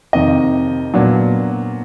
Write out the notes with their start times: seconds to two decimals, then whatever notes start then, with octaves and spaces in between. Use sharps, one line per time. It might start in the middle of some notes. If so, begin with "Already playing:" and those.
0.13 F2 C3 D#3 D#5
0.94 A#2 F#3 B3 D4